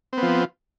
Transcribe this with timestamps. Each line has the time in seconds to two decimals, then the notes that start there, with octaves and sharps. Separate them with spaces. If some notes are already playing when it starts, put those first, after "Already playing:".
0.13 C4
0.18 B3
0.23 F3